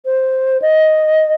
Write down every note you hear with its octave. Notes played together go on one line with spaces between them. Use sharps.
C5
D#5